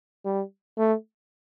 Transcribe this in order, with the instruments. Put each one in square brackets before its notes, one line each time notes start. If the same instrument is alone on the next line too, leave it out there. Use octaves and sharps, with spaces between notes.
[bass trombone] G3
A3